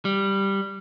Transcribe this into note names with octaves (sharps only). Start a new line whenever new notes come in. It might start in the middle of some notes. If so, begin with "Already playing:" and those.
G3